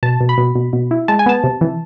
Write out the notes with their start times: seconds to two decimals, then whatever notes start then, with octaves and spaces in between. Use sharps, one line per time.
0.03 B2 A5
0.21 B2
0.29 B5
0.38 B2
0.55 B2
0.73 B2
0.91 E4
1.08 G#3 A5
1.19 G#5
1.26 B3 A5
1.44 C3
1.61 E3